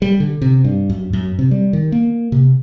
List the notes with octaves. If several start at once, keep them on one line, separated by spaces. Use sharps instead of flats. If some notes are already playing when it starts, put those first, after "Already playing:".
G3
D3
C3
G2
F#2
F#2
C3
G3
D#3
A#3
C3